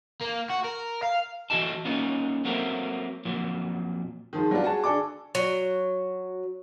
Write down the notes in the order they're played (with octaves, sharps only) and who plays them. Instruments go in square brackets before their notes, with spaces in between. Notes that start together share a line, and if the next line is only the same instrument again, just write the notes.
[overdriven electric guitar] A#3
F#4
A#4
F5
[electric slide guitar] E3 G#3 A3 F#4 D#5 A5
A#3 C#4 D#4 F4
F#3 A3 A#3 C4 A#4
F2 A#2 F#3
[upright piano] D#3 F3 G#3
F#3 G3 B3 D4 F4
F#4 G#4 A5
D3 G#4 A4 D5 D6
[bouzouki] F#3